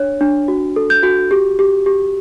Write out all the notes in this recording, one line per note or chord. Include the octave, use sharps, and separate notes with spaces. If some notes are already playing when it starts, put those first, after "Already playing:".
Already playing: D4 C#5
D4
F#4
A4
G6
F#4
G4
G4
G4